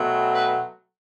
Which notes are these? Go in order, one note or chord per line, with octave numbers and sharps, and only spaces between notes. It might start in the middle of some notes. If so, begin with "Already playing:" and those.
Already playing: B2 F#3 A3 C4
B4